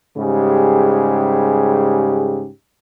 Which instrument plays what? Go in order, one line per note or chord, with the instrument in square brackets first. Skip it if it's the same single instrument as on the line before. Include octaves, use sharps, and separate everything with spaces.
[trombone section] G#2 C#3 G3 G4